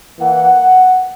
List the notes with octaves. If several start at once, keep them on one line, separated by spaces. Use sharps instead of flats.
E3 A#3 E4 F#5